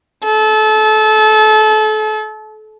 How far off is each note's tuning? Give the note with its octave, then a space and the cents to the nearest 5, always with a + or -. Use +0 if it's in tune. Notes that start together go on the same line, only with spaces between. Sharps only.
A4 -30